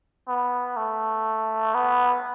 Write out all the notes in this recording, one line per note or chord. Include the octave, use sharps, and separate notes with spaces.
B3
A3
B3